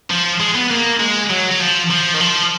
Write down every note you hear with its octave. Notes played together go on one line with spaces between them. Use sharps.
F3
G#3
B3
A#3
G#3
F#3
F#3
F3
F3
D#3
F3